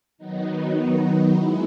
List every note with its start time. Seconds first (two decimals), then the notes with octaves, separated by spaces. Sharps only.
0.18 D#3 F#3 B3 D#4
1.35 G#3 B3 E4